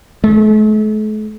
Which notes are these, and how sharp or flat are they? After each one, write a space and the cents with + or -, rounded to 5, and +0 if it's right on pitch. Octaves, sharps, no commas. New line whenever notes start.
A3 -45